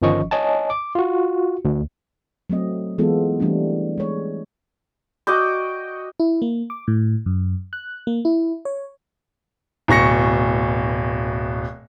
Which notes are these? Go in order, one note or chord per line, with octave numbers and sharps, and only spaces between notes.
G1 D#3 F3 C#4 D#5 C#6
C#5 D#5 G#5 A5
D6
F4 F#4
D2
F#3 A3 C4 D#5
E3 G#3 B3 F4 A4
E3 G3 A3 C4 D4
G#3 C#5
F#4 D#5 G5 D6
E4
A#3
D6
A2
F#2
F#6
A#3
E4
C#5
D1 B2 C#6 A#6 C#7